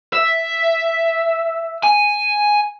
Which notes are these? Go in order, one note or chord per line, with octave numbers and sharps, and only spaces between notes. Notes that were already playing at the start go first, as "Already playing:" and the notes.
E5
G#5